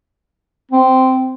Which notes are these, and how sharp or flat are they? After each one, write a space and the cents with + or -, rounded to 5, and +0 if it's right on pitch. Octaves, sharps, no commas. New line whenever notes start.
C4 -10